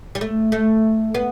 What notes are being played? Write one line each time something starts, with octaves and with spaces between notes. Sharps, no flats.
G3
A3
A3
B3